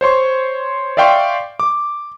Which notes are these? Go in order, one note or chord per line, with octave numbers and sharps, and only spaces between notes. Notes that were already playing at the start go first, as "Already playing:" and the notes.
C5 C#5 C6 C#6
D5 E5 F5 G5 C6 C#6
D6